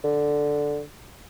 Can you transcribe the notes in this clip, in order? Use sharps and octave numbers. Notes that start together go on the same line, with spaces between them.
D3